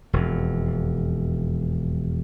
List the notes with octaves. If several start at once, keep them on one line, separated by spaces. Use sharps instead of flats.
E1 F2